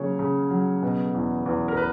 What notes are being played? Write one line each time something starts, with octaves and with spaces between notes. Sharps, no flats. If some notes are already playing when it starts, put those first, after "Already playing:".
Already playing: C#3 F#3 A#3 C#5
C#3
F#3
B2
E2
E2
A#4
B4